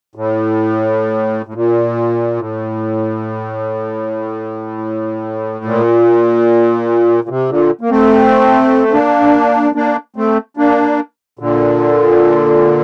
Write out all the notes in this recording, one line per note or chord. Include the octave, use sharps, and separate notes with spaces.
A2
A2
A#2
A2
A#2
A#2
C3
A#2 D3
A#3
A3 C4
C4
A#3 D4
A#3 D4
A3 C4
A#3 D4
A#2 D3